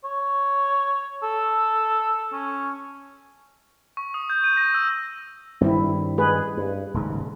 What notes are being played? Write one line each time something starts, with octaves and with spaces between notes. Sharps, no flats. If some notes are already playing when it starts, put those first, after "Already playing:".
C#5
A4
C#4
C#6
D#6
G6
D#7
A#6
E6
G2 D#3 G3 C4 E4
G#3 G#4 B4
G2
D#1 G#2 C#3